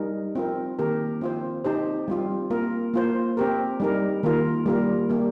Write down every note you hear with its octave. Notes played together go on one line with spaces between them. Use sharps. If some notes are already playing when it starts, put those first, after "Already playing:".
Already playing: G3 D#4 A#4
C4 F4 A#4
D#3 A#3 G4 A#4
C4 F4 C5
C4 D#4 G4 C5
G3 C4 F4
A#3 F4 A#4
A#3 F4 C5
C4 G4 A#4
G3 D#4 A#4
D#3 A#3 F4 A#4
G3 A#3 F4 A#4
G3 A#3 G4